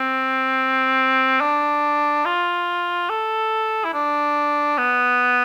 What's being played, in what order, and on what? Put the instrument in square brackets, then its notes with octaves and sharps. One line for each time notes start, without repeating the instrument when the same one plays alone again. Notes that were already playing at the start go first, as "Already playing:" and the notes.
Already playing: [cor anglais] C4
D4
F4
A4
E4
D4
B3